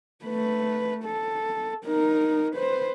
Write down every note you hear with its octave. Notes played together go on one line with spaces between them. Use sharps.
A3 B4
A4
D#4 A#4
B4 C5